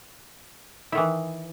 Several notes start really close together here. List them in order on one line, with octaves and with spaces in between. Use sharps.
E4 D#3 E3